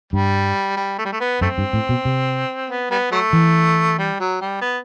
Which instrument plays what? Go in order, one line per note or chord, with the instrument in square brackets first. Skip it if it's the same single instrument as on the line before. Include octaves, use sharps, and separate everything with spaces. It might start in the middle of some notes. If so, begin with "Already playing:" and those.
[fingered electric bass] G2 [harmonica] G3
[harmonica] G3
A3
G3
A3
B3
[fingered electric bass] F#2 [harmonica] A3 C4
[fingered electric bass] G2
A2
B2
C3
[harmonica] B3
G3 B3
F#3 A3
[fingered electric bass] E3
[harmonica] G3
F#3
G3
B3